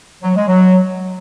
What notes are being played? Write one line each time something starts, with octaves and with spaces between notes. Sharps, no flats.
F#3
G#3
F#3